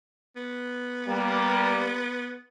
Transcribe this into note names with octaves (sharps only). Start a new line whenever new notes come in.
B3
G3 A#3